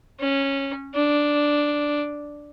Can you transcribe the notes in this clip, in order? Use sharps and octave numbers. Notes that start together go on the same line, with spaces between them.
C#4
D4